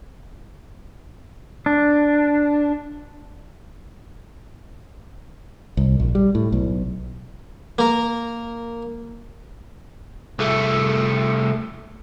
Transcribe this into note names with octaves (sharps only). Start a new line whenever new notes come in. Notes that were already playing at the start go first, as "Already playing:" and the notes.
D4
C2
A#1
G3
A2
B1
A#3 A#4
C2 A3